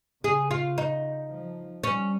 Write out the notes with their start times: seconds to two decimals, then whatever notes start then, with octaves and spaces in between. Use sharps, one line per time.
0.24 C#3 G#4
0.51 F4
0.78 D#4
1.30 F3
1.83 G3 C#4